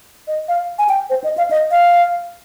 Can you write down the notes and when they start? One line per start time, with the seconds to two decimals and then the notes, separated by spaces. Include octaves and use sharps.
0.28 D#5
0.48 F5
0.79 G#5
0.89 G5
1.10 C5
1.24 D#5
1.38 F5
1.51 D#5
1.71 F5